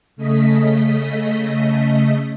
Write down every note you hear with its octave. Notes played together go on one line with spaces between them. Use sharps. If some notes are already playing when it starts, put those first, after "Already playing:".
C#3 A3 D#5 B6